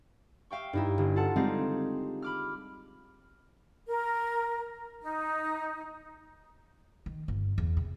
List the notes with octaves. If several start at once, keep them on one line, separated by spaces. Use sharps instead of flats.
E5 F5 G5 C#6
G2 D#4 E4
G1
F4 A4 F#5 A5
G3 G#3 C4 D#4 G#4 F5
B5 D6 F6
A#4
D#4
D#3
G1
E2
C3